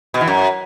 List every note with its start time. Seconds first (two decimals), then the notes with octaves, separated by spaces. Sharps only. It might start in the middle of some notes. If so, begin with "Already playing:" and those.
0.14 B2
0.21 E3
0.28 F#2